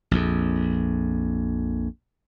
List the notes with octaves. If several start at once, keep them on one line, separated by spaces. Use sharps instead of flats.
A#1 F2